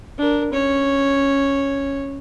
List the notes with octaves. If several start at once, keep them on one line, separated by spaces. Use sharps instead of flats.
D4 A#4
C#4 C#5